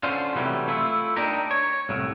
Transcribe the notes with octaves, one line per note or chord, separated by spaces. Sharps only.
D3 C#4 F4 C5
C3 E3 F#3 G3 A3
A3 E4 F4
D4 D#4 G4 A#4
C#5
C2 A2